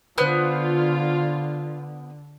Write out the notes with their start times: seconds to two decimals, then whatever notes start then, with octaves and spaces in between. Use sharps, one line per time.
0.18 D3 B3 F4 C5 F#6